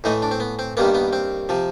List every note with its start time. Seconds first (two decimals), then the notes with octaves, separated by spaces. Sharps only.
0.04 A2 E3 A3 D#4
0.22 D4
0.31 C4
0.40 B3
0.59 C4
0.77 G2 D#3 G3 A#3 B3
0.95 B3
1.13 C4
1.49 C3 F3